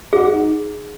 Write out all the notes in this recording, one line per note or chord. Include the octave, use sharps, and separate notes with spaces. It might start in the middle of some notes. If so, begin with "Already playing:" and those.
F#4 G#4
D#4